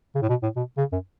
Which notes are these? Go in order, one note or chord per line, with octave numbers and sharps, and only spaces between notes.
C#3
A2
B2
A2
B2
C#3
F#2